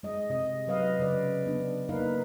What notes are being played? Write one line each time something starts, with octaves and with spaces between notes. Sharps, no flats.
G#3 D#5
C3 D#5
F#3 B4 D#5 F5
C#3 B4 D5
B3 D4
A#3 D#4 A#4 B4 F5